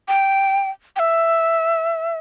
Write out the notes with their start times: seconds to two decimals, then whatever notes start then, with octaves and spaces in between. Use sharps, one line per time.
0.08 G5
0.96 G5
0.99 E5